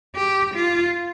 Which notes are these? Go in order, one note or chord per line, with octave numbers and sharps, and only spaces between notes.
G4
F4